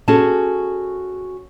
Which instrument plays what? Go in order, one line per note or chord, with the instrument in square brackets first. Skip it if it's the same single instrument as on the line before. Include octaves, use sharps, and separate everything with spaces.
[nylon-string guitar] C#4 F#4 G#4 A4 A5